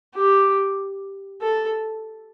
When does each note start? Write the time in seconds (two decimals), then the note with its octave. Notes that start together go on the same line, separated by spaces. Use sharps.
0.14 G4
1.42 A4